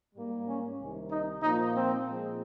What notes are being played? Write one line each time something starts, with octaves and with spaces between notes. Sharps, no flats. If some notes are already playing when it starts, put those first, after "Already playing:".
G#2 G3 A#3
C#4
C2 C3 D#3
D#4
A#2 F3 A#3 D#4
C4
A#2 F3 G#3